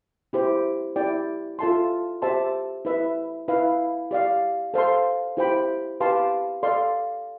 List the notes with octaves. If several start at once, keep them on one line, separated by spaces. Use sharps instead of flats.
E4 G4 C5
E4 G4 D5 G5
F4 A4 E5 A5 C6
G4 C5 E5 A5 C6
E4 B4 E5
E4 B4 F5
G4 D5 F5
A4 C5 F5 A5 C6
E4 G4 C5 G5 B5
G4 B4 F5 A5 C6
A4 D5 F5 C6